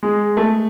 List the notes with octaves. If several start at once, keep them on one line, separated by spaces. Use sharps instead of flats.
G#3
A3